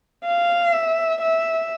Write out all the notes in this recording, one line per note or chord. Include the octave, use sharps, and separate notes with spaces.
F5
E5
E5